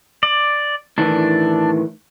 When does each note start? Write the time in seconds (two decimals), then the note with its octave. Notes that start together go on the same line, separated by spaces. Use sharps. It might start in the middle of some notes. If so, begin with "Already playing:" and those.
0.23 D5
0.98 A2 D#3 E3 D4